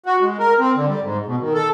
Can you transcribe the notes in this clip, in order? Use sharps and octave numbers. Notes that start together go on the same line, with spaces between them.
F#4
G#3
A#4
C4
D3
G3
G#2
B2
D#3
A4